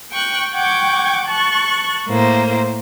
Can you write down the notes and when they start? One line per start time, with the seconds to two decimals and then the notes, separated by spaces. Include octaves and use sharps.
0.10 G5 C#6 F#6
0.53 F#5 G5 C#6 D6 G#6
1.26 A5 C#6 F#6
2.07 A2 A#3 C5